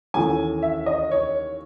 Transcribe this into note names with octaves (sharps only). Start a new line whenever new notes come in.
D#2 C#3 E3 A3 G#5
E5
D#5
C#5